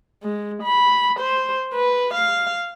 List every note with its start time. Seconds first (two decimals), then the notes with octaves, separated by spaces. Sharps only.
0.23 G#3
0.63 B5
1.20 C5
1.74 B4
2.14 F5